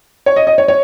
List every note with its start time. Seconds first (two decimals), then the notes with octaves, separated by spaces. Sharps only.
0.26 C#5
0.36 D#5
0.47 D#5
0.58 C#5
0.68 C#5